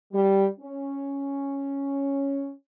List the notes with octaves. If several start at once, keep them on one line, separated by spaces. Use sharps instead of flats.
G3
C#4